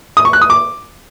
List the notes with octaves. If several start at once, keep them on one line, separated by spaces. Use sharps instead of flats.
D#6
C#6
F#6
D#6
D6